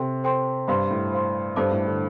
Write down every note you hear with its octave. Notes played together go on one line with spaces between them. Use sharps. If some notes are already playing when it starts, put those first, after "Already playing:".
Already playing: C3 A4 C5 G5 C6
A4 C5 G5 C6
G2 C5 F5 C6
A2
C5 F5 C6
G2 A4 C5 A5 D6
A2
D3